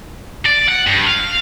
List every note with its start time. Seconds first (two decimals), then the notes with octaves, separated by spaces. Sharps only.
0.46 D5
0.69 F#5
0.87 G2
1.07 F5